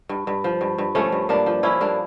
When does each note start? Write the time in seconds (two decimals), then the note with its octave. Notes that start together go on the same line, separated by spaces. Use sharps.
0.09 G2
0.27 G2
0.44 F3
0.61 G2
0.78 G2
0.95 F3 A3 C#4
1.12 G2
1.29 G2 A#3 D4
1.46 F3
1.63 F3 C#4 E4
1.81 G2 A#3 D4